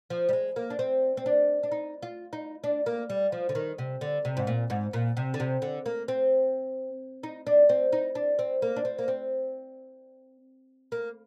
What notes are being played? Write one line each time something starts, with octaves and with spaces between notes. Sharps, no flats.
F3
G3
G#3
A#3
D4
C4
C4
D4
D4
D#4
F4
D#4
D4
A#3
G3
F3
D3
D#3
C3
D3
C3
G#2
A#2
G#2
A#2
C3
D3
C3
D3
A#3
C4
D#4
D4
C4
D#4
D4
C4
A#3
D4
C4
A#3
C4
A#3